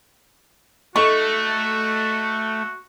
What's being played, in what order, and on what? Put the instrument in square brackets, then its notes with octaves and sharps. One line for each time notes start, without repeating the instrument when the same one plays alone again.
[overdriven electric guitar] A3 [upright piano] D#4 A4 [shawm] F#4 [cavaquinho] C#6